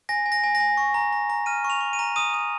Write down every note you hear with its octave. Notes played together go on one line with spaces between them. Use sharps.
G#5 A#6
G#5
A#6
G#5
A#6
G#5
C#6
A#5
A#5
A#5
F6 D#7
C#6
F7
C#6
D#7
A#5
D#6 D#7
D#6